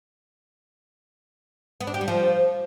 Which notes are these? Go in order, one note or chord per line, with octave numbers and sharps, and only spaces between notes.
B3
D4
G4
G3
F3